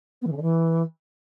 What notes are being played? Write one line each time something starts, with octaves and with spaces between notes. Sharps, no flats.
B3
E3
C#3
D3
E3